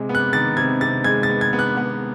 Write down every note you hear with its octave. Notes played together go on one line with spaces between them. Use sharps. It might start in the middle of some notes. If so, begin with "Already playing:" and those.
Already playing: C3 G#3
B3
F#6
D#3 A6
C3 G#6
C3 A6
G#3 G#6
A6
B3
G#6
B3
F#6
B3